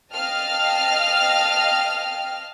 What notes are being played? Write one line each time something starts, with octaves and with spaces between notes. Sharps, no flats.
D#5 F5 G5 A5 F6